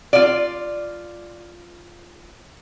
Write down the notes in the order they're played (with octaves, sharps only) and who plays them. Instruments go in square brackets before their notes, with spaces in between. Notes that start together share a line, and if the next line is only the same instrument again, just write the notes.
[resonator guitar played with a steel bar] F4 D5